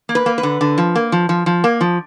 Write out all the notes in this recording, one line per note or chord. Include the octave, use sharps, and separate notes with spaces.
A#3
B4
A#3
B4
D3
D3
F3
A#3
F3
F3
F3
A#3
F3